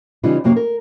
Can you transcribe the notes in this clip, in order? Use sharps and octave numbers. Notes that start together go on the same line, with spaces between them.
C#3 E3 G3 D#4 F4
F#2 C3 A#3 F#4 F5
A#4